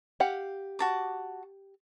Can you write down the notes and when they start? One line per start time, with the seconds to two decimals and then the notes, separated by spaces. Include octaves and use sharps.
0.20 G4 F5 F#5
0.79 F#4 A5 D6